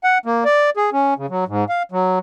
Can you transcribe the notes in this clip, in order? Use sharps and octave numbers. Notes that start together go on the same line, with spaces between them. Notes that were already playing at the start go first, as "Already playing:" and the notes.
F#5
A#3
D5
G#4
C#4
C#3
F#3
G#2
F5
F#3